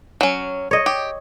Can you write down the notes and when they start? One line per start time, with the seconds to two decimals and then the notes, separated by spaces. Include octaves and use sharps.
0.21 F#3 C#4
0.71 C#5 D#5
0.86 G4